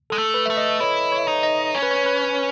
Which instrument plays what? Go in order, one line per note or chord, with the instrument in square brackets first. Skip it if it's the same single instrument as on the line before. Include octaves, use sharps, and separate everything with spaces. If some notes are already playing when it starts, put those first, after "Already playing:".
[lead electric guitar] G#3 [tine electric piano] A4
[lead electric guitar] A3
[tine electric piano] B4
[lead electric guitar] A3 [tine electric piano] E5
[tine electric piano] D#5
[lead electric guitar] E4 [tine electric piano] C#5
[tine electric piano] C#5
[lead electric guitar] D#4
[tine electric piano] D#5
[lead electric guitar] C#4 [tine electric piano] C#5
[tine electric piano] B4
C#5
B4